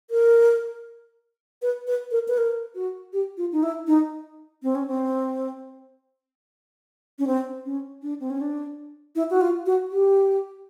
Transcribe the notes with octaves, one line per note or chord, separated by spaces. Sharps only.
A#4
B4
B4
A#4
B4
A#4
F#4
G4
F4
D#4
E4
D#4
C4
C#4
C4
C#4
C4
C#4
D4
C4
C#4
D4
E4
F#4
F4
F#4
G4